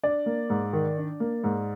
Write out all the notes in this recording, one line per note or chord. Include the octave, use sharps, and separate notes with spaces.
D4 D5
A#3
G#2
D#3
D4
A#3
G#2